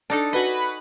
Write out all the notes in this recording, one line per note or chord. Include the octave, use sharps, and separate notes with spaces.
D4 D#4 A4
F#4 B4 D#5 G#5 B5